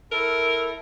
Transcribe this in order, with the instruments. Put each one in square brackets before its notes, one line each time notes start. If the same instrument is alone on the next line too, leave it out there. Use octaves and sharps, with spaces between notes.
[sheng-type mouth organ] E4 A4 [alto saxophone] A#4